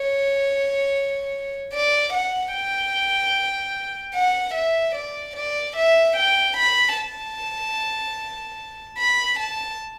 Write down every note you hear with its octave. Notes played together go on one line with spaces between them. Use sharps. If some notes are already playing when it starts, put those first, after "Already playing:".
Already playing: C#5
D5
F#5
G5
F#5
E5
D5
D5
E5
G5
B5
A5
B5
A5